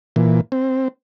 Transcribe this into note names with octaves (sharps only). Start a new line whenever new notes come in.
A#2 E3
C4